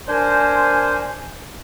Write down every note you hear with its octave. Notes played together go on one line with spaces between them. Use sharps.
D4 A#4 C5 G#5